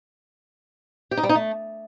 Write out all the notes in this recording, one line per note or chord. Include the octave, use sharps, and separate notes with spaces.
G4
D#4
G3
D#4
A3